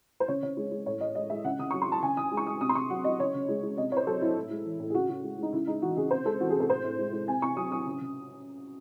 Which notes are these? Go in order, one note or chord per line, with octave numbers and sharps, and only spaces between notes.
C5
C#3 C#5
C#3 C#5
G#3
G#3
A2 C#5
A2 D#5
G#3 D#5
G#3 E5
C#3 F#5
C#3 D#6
F#3 C#6
C6
F#3 A5
C#3 G#5
C#3 D#6
G#3
C#6
G#3 D#6
C3 D#6
C6
C3 C#6
F#3 F#5
F#3 D#5
C#3 C#5
C#3
G#3
G#3
C3 D#5
C3 C5 C#5
F#3 A4
F#3 E4
A2
G#3
E3
A2
G#4
C#3 F#4
C#3 F#4
G#3
G#3 D#4
C#3 E4
G#3 D#4
E3 F#4
C#3 G#4
C3 C5
G#3 A4
E3 F#4
G#4
C3
A4
A2 C5
A2
G#3
G#3
C3 G#5
C3 C#6
F#3 D#6
F#3 D#6
C#3
C#3